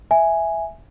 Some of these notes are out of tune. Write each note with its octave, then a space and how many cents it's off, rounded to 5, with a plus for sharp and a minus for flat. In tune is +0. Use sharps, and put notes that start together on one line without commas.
E5 +0 G#5 +0